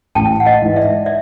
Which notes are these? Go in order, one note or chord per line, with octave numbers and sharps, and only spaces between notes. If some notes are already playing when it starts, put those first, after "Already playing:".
A1 G5 A5
F#5
D#5 F5
G#2 E3
D5 E5
D5 E5